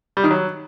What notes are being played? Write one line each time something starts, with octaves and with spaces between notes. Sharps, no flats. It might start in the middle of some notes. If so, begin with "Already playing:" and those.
G3
D#3
F#3